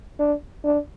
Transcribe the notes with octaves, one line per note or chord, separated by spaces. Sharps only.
D4
D4